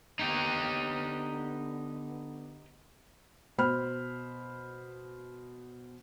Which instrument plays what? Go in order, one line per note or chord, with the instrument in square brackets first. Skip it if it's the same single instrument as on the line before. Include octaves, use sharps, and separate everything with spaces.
[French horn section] D3 B3 [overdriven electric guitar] D#4 G4
[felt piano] B2 C5 B5 F6